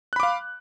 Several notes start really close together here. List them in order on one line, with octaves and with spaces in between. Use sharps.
F#6 B5 D6 F5